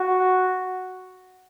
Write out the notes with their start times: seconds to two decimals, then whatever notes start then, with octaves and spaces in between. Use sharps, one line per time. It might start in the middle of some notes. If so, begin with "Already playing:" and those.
Already playing: F#4